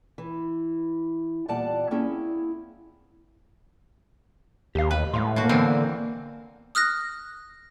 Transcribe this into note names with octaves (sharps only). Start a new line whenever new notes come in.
E3
E2 A#2 G3 D5 F#5 A5
A#3 C4 C#4 E4 G#4
D#2 G4 F5
D2 C3 B4
A2 G#3 F5 C6
B2 A#3 F#4
D3 E3 B3 C4
D#6 F6 F#6 A#6